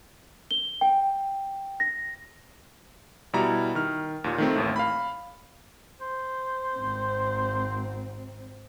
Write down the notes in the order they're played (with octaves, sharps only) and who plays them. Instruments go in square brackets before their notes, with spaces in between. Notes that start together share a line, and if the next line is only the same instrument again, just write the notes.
[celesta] G7
G5
A#6
[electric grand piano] B2 G3 E4 A#5
D#3 F6
D#2 A#2
D#3 A3 C4
A1 D#2 A2
F5 B5
[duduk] C5
[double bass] G#1 C4